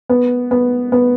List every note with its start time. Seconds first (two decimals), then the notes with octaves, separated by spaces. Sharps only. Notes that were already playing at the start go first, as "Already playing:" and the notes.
0.09 B3
0.51 B3
0.92 B3